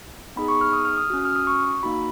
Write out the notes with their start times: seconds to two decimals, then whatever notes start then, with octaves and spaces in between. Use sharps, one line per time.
0.36 B3 D#4 G#4 B5
0.48 C#6
0.61 F6
0.73 D#6
0.85 F6
0.98 D#6
1.10 C#4 F#4
1.25 F6
1.36 D#6
1.47 C#6
1.83 A#3 D#4 F#4 B5